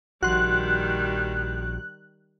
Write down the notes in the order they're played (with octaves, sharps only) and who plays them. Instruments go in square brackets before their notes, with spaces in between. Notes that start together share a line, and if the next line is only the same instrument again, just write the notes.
[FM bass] A#1 [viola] D#3 G3 [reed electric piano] F#4 C6 [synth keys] F#6